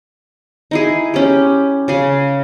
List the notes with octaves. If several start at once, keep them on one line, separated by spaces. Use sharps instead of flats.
D#4 E4 G#4
C#4 G4
C#3 G#4